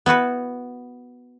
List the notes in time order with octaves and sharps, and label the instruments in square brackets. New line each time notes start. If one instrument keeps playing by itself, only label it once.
[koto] B3 E4 F#4 B4